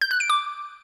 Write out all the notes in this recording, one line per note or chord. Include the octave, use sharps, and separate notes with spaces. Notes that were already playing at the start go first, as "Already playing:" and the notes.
G6
F#6
D7
D6